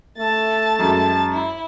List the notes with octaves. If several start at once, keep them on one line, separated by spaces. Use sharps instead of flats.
A3 A5 A6
F#2 G#3
E4